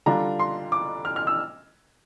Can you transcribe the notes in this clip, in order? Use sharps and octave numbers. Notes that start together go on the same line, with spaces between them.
D3 G3 D4 F4 A#5
C6
D6
F6
F6
E6